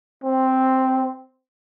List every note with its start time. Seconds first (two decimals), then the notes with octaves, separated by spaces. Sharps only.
0.24 C4